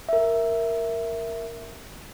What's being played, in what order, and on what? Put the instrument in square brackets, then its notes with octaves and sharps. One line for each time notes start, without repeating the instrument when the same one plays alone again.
[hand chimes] A#4 E5